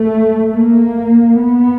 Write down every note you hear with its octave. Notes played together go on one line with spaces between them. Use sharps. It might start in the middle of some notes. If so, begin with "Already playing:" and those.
Already playing: A3
A#3
B3